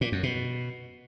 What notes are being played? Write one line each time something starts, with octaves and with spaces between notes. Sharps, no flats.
A#2
F#2
B2